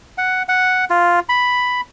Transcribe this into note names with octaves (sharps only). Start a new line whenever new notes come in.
F#5
F#5
F4
B5